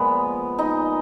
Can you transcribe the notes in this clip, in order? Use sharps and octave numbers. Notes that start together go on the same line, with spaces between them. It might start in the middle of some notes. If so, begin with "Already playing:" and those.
Already playing: A#2 F3 G#3 B3 B4
D#4 D#5